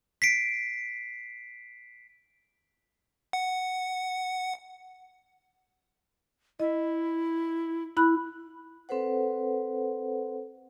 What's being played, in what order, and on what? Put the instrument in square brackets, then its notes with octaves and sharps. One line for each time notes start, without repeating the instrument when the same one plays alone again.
[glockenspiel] B6 C7 D7
[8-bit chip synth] F#5
[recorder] E4 [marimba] D#5
[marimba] E4 B5 F#6
[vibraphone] C4 A4 B4 C5 F#5